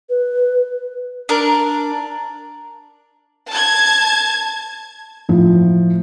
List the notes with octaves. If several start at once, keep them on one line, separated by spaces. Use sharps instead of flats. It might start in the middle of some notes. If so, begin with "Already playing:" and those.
B4
D4 A#4
A5 G#6
A2 F3